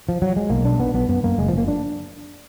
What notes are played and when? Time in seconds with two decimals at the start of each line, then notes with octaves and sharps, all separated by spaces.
0.09 F3
0.22 F#3
0.36 G#3
0.50 B1 A#3
0.65 B2 D4
0.80 B1 B3
0.94 B1 B3
1.09 F#2 B3
1.23 F#2 A#3
1.38 F#1 G#3
1.48 F3
1.54 F#1 A#3
1.68 D4